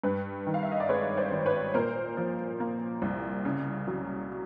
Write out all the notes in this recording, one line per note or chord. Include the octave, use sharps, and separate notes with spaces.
G2 B4
D#3
F5
E5
D#5
D5
G#3 B4 C#5
C5 D5
G#1
B4 C#5
A#2 A#4 C5
F3
A#3
C2
C#3
F#3